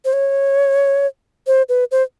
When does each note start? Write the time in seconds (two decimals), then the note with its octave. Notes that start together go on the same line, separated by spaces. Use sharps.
0.05 C5
0.13 C#5
1.47 C5
1.69 B4
1.91 C5